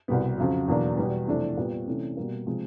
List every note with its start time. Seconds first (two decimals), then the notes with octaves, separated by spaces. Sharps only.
0.08 C2 B2 G3 B3
0.38 F2 C#3 F#3
0.68 E2 B2 F#3 A#3 D4
0.97 E2 B2 G3 B3
1.27 F2 C3 E3 A3 D4
1.57 A#2 G3 B3
1.87 C3 E3 A3 C#4
2.17 B2 G3 A#3
2.47 C3 F3 G#3